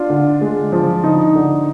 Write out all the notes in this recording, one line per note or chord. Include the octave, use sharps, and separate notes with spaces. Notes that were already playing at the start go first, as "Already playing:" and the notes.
Already playing: D4 F4
D3
G#3
F3
D3 D#4
D3